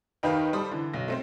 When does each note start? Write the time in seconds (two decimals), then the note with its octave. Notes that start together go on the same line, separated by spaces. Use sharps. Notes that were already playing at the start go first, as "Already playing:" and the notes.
0.23 D#2 D#3 B4 D#5 F5 G5
0.53 G3 A4 C5 B5 D#6
0.72 D3 E3
0.93 B1 A#6
1.08 A3 C4 C5